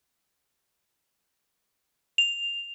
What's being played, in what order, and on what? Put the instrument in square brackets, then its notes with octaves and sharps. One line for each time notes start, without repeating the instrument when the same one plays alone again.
[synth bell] F7